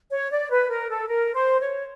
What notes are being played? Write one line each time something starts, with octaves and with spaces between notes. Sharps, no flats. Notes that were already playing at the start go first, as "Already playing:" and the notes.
C#5
D5
B4
A#4
A4
A#4
C5
C#5